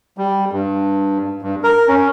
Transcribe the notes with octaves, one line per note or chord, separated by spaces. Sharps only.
G3
G2
G2
A#4
C#4